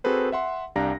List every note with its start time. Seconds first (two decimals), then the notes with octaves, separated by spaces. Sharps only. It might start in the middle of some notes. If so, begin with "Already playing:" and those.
0.04 C4 F#4 G#4 A4 B4 C5
0.32 E5 F#5 C6
0.76 C2 D4 G4 F5 A#5 A#6